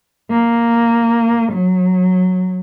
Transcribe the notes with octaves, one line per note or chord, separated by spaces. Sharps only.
A#3
F#3